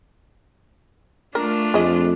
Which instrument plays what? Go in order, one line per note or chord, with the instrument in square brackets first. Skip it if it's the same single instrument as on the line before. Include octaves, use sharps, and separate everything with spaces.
[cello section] A3 [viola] D4 F4 [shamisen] A#4
[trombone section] F2 [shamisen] G#4 D#5